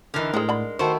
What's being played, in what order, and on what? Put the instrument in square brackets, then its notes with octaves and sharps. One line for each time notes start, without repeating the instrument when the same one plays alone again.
[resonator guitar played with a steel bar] D3 E3 [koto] D#4 A#4 F5
[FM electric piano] A2 [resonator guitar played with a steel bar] G#3 [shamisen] C4 G#4
[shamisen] D3 B5
[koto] D#3 A3 E4 [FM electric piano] F#4 C#6 [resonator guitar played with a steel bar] C5